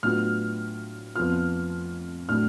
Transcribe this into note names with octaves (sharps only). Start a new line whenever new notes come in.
A2 F#3 B3 D4 F4 F6
F2 F3 B3 F4 F6
A2 F#3 A3 D4 F6